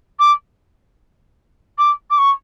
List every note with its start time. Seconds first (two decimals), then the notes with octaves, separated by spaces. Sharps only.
0.19 D6
1.78 D6
2.10 D6
2.18 C#6